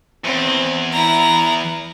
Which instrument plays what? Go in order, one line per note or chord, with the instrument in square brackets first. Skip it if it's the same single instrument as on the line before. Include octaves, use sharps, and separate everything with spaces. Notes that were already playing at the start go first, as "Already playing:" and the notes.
[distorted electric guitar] E2 [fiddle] C4
[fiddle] E4 A#5